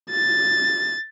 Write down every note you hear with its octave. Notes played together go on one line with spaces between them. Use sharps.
A6